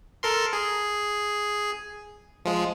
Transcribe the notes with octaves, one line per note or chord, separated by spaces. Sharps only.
A4 A#4 C6
G#4
F3 G#3